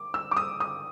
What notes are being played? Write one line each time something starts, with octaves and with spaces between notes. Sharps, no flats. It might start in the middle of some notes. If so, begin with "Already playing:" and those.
Already playing: D6
E6
D6
D#6
D#6